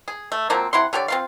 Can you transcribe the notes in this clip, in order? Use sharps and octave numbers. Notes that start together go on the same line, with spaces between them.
G#4
A3
F3 F#3 A#3 C4
C3 E4 F#5 C6
D3 G4 C#5 D5
C4 F4 F5